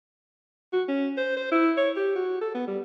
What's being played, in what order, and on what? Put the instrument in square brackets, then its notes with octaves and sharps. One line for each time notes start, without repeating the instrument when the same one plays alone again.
[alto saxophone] F#4
C#4
C5
C5
E4
C#5
G4
F#4
A4
B3
G3